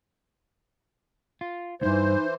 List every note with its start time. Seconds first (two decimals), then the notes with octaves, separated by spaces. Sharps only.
1.41 F4
1.81 D2 G2 E3 D#4 C5